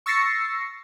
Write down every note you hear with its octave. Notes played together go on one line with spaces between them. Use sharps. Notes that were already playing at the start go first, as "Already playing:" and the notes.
C#6 E6 A6 A#6 C7 C#7